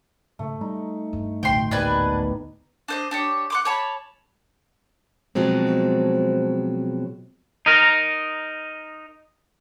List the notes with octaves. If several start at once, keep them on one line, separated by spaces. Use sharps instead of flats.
G#2 C#3 A3
G3 D#4
G2
A1 D2 G2 B2 D3 G5 C6
G#2 D#3 G3 A#3 B3 D4 B4 G#5
D4 C5 D#5
D4 G4 C#5
F#5 C6 D6
C#5 A5 B5
B2 F3 F#3 G#3 C4
D#4 A#4